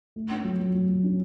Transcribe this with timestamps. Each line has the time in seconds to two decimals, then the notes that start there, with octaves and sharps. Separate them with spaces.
0.16 A3
0.31 C#4
0.44 F#3
0.60 F#3
0.74 F#3
0.88 F#3
1.04 C#4